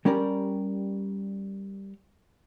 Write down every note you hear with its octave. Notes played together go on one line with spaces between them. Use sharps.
G3 C#4 G4 A#4 D5